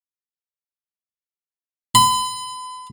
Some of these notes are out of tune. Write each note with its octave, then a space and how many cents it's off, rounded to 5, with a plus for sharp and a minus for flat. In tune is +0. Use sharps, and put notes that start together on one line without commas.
B5 +40